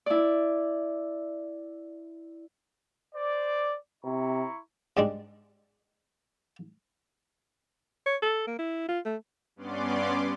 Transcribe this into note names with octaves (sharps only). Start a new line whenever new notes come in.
E4 D5
C5 D5
C3 E4 A#5 C#6
G#2 G3 G#3 D4
C#5
A4
A#3
E4
F4
A3
G2 B3 C#4 D5 C6 D6